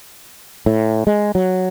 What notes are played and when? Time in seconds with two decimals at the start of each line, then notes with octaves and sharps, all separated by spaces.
0.66 A2
1.07 G#3
1.35 F#3